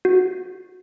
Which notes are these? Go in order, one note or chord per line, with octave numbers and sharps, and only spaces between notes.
F#4